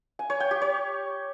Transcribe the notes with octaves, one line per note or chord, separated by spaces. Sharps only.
G#5
C#5
G5
G4
C#5